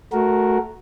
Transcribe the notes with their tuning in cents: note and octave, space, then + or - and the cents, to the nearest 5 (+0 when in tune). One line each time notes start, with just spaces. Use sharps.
A3 -15 F#4 +0 A#4 +0